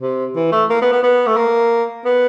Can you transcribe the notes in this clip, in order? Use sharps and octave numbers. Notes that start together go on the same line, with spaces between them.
C3
E3
A3
A#3
B3
B3
B3
A3
A#3
B3